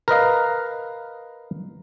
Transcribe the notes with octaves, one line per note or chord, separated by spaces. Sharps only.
A#4 B4 D#5 F5